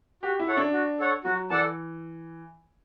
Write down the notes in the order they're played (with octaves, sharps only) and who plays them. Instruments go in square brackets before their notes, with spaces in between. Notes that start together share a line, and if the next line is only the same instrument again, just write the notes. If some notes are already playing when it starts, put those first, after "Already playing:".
[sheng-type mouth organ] F#4 [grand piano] G4
[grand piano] E4
[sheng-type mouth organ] A4 C#5 F#5
[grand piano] D4
[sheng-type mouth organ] F#4
A4 C#5 F#5
[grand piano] F#3 [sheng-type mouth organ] F#4
[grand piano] E3 [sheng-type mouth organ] A4 D5 F#5 A5